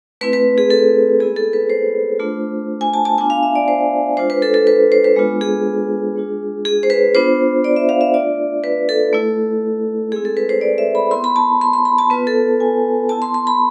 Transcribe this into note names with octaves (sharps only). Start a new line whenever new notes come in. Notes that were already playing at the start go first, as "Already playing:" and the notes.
A3 C4 E4 B4
B4
G#4
A4
G#3 B3 E4 G#4
A4
B4
C5
A3 D4 F4
G#5
A5
A5
B3 D4 F4 G#5
F5
E5
D5
C5
G#3 D4 F4 C5
B4
A4
A4
B4
C5
B4
G#3 B3 D4 F4
G#4
G#3 D4 F4
G#4
C5
B4
B3 D4 F4 C5
D5
E5
F5
E5
A3 D4 F4 D5
B4
A4
A3 E4
G#3 C4 E4 G#4
A4
B4
C5
D5
E5
B5
B3 E4 C6
B5
A5
C6
C6
B5
A5
B3 F4 B4
A4
G#5
B3 E4 A5
C6
C6
B5